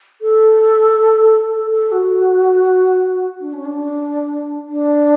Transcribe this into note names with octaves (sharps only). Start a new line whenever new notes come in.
A4
A4
A4
F#4
D4
C#4
D4
D4